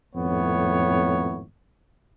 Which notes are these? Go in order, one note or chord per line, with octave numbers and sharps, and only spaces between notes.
G#1 F2 A2 B3 C#5